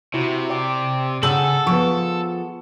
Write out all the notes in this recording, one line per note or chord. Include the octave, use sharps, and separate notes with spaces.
C3 E4 F#4
D5 G5 D6
C#3 G#4 A4 F#5 G#5 E6 F#7
F3 B3 C#6